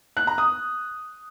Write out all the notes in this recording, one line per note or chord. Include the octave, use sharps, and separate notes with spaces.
F#6
A#5
D#6